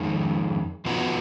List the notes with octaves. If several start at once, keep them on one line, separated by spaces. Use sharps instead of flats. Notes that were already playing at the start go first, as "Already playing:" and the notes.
Already playing: F2 D#3 G#3 D#4
F2 F3 B3 D#4 F#4